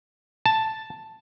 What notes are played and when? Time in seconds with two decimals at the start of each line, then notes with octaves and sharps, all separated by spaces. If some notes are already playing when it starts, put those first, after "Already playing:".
0.46 A5